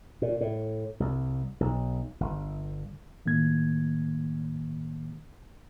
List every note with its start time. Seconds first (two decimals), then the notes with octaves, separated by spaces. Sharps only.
0.22 A#2
0.41 A2
1.00 C2
1.60 B1
2.20 G1
3.26 A2 D#3 A#3 G#6